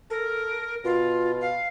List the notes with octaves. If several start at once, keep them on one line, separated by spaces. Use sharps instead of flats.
A4 A#4
B2 F4
F5